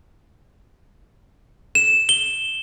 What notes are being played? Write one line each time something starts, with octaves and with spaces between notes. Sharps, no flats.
E7
G7